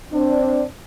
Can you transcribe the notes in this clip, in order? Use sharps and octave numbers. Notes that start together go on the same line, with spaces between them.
C4 D4